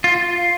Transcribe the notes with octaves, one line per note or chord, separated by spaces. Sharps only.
F4